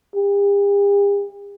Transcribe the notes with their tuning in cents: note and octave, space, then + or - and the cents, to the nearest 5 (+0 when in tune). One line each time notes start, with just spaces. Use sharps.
G4 +45